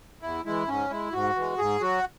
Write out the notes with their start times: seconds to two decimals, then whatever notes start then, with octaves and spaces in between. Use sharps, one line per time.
0.22 E2 E4
0.45 E3 G#3 E4
0.68 G#2 C#4
0.90 G#3 E4
1.13 G#2 F#4
1.36 E3 G#3
1.58 G#2 G#4
1.81 F#3 F#4